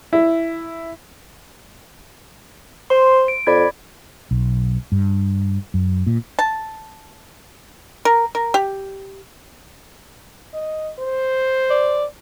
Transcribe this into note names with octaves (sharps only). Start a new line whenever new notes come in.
E4
C5 C6
D7
F2 D5 B5 G#6
B1
G2
F#2
A#2
A5
A#4
A#4
G4
D#5
C5
D5